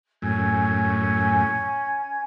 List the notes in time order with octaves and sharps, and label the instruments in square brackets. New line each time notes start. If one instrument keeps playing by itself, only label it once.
[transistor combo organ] F#2 A2 [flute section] C#4 G#5 G#6